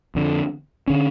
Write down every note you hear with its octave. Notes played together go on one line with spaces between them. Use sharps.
F2 D3
D3 C#4